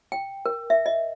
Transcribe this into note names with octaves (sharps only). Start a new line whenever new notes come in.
G5
A#4
E5
D#5